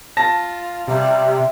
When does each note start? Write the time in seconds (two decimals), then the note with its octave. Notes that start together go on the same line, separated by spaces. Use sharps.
0.17 F4 A5 A#6
0.88 C3 G3 E5